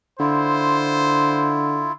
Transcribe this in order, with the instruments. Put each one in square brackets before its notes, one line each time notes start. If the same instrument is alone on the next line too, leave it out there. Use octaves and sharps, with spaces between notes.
[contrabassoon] D3 [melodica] E4 F4 [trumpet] C5